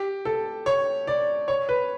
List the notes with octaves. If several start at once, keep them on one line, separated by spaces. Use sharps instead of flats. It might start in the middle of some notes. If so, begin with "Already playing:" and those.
Already playing: G4
A4
C#5
D5
C#5
B4